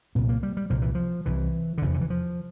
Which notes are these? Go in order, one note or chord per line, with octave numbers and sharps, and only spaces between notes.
C2 A#2 C4
A#3
G3
G3
C2 A#2 F3
E3
F3
C2 C3 E3
D3
F1 E2 C3 E3
D3
E3
F3